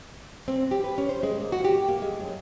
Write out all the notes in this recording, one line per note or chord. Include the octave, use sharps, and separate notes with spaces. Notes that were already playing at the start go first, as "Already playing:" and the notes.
C4
G4
B4
C#4
C5
G#3
A#3
F#4
G4
A#3
G#3
F#2